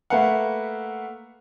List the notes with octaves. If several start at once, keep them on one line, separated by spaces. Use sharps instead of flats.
A3 A#3 B4 F5 F#5